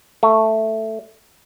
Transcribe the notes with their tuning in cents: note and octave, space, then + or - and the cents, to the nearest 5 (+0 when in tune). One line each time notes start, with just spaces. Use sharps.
A3 +5